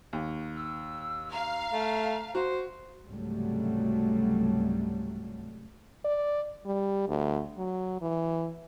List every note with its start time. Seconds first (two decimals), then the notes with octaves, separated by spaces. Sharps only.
0.13 D#2
0.56 E6
1.31 F5 A#5
1.73 A3
2.35 F#4 C5
3.05 C#2 G#2 C3 F#3 G3 A3
6.05 D5
6.65 G3
7.08 D2
7.57 F#3
8.01 E3